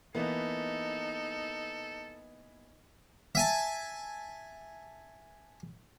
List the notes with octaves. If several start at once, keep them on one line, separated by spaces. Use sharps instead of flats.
E3 A#3 B3 D#4 A4
E5 G#5 A5